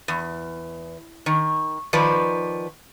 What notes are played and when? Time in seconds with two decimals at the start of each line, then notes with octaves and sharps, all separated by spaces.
0.08 E2
1.26 D#3
1.93 D#3 F3 B4 D5